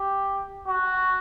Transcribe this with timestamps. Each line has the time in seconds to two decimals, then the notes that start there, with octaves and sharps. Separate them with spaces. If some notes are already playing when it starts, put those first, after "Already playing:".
Already playing: G4
0.67 F#4